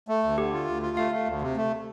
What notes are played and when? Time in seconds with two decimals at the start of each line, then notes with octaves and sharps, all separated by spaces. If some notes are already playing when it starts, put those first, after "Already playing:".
0.08 A3
0.23 D2
0.38 D3 G4
0.53 F4
0.68 D2
0.82 F4
0.97 A3 F5
1.12 A3
1.27 D2
1.42 C3
1.57 A3